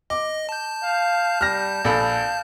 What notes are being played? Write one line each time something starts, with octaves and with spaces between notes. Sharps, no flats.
D#5 D6
A5 G6
F5
G3 F6 A#6
A#1 A4 F5 B5